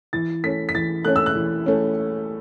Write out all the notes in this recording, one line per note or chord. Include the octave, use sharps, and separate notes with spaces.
E3 A6
A3 C#4 B6
B6
E3 A6
A3 C#4 F#6
E6
F#6
E3
A3 C#4